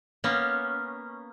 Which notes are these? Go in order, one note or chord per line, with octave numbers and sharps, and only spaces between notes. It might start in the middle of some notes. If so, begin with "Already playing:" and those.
A#3 B3 C#4